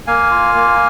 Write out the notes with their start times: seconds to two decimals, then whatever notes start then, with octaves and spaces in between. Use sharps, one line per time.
0.07 A#3 F5 G#5
0.31 F4
0.55 A#3